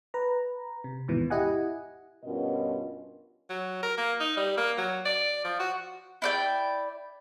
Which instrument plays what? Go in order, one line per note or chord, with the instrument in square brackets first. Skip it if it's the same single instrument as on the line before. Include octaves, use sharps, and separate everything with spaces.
[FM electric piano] B4 A#5
C3
D#2 G#2 B2 E3
E4 G4 D#5 F#5 G#5
[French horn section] G2 B2 C#4 F4 A#4 D#5
[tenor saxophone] F#3
A#4
A#3
D#4
G3
A#3
F#3
D5
F3
F#4
[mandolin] E4 D5 G5